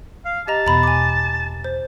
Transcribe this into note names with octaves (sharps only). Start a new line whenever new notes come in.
F5
G4 D#5 A5 A#5
E2 B2 A#5 B5
G#5 D6
C5